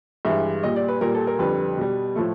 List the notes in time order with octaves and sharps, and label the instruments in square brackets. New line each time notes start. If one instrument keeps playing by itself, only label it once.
[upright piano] G2 E3 G#3 E5
A#2 G3 D#5
D5
B4
A#2 G3 A#4
A4
A#4
F2 D3 G3 B4
B2 G3
A2 F3 A3